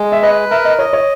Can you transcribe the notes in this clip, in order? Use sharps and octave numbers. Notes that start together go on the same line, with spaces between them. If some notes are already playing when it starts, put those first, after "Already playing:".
Already playing: G#3
E5
B4 D#5
A#4 E5
D#5
C#5 D#5
C#5